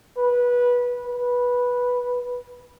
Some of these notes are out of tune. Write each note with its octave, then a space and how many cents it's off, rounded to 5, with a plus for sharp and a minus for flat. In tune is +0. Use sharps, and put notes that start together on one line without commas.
B4 -20
B4 -10